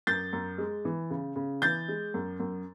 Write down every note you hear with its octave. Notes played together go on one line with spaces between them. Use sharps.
F#2 G6 A6
F#2
G#3
E3
C#3
C#3
E3 G6 A6
G#3
F#2
F#2